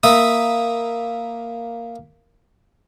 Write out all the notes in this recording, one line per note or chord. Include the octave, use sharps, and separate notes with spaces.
A#3 E5 B5 D#6